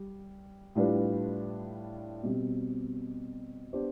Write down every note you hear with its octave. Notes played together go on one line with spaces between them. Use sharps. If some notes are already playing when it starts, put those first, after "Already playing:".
Already playing: G3
A2 G3 D4 F4 B4
B2 G3 C4
B3 D4 G4 C5